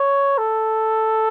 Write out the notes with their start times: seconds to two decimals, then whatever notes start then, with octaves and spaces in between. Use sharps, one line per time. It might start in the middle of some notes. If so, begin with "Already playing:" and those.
Already playing: C#5
0.38 A4